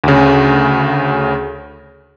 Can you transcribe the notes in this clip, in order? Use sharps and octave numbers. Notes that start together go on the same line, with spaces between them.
D2 C#3